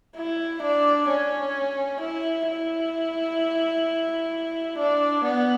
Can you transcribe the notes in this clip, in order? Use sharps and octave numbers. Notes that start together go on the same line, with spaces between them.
E4
D4
C#4
E4
E4
D4
B3